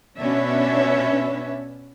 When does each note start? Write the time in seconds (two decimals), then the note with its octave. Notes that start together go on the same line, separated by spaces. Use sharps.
0.17 B2 C#4 D4 B4 C#5 E5